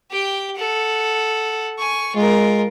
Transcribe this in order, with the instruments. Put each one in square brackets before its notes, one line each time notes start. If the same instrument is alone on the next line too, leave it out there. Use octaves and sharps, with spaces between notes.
[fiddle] G4 G5
A4 F#5
G#5 C#6
[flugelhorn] G#3 [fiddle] F4 A#4